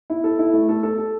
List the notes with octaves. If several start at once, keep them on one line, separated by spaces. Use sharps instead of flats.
E4
A4
E4
A3
A4
A4
A4